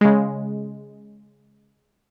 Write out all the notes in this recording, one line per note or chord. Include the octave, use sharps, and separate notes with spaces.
C#3 G#3